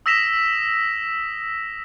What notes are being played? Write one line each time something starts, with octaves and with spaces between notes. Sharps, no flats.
D#6 E6 A#6 B6 E7 F7